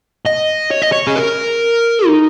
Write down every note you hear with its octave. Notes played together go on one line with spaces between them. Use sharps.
D#5
C#5
D#5
C#5
G#4
A#4
D#4